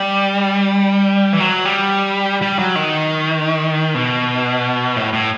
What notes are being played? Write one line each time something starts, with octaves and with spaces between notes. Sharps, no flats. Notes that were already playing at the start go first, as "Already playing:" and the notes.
Already playing: G3
E3
F#3
G3
G3
F#3
D#3
B2
A2
A2